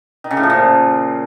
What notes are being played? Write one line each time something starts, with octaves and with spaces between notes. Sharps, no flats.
D#3
C#3
A2
F3
A#2